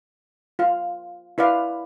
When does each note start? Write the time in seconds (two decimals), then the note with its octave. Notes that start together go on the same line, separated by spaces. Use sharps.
0.59 F4 F5
1.38 E4 B4 D5 F5